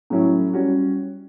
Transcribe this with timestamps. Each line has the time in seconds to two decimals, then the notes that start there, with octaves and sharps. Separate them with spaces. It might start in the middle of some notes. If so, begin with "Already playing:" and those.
0.10 A2 F#3 C#4 E4
0.53 G3 C#4 F#4